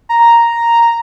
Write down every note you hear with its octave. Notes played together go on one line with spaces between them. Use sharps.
A#5